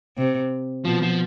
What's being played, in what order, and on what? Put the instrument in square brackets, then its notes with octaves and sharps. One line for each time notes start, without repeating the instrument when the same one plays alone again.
[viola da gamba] C3
[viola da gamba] B2 [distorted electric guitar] F3
[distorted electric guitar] F3